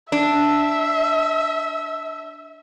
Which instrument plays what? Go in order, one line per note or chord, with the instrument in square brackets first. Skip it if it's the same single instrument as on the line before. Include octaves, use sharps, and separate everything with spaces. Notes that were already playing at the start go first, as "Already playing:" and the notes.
[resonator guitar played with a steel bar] D4 [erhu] E5